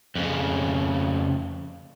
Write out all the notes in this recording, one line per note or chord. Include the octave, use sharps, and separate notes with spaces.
F2 C#3